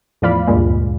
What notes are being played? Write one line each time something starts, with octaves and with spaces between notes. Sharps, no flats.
E2 A2 F3 D5 F5 B5
D2 G2 A#2 G#3